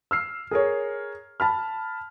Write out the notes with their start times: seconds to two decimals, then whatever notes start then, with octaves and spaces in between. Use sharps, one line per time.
0.11 E6 F6 C7
0.51 G#4 A#4 C#5
1.40 A5 B5 F6